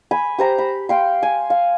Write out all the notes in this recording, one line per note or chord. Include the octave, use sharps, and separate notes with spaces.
G#5 B5
G4 C5 A#5
B5
F5 G5 C6
G#5
F5